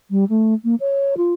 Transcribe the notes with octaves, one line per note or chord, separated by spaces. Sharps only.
G3
A3
A#3
C#5
F4